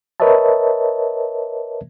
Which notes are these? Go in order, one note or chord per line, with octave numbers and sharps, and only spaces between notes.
A#4 B4 C#5 D#5 E5 A5